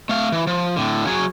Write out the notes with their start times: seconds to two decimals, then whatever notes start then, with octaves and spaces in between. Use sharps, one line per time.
0.09 A3 F5
0.32 E3
0.47 F3
0.76 A2 D3
1.07 F#3 G#4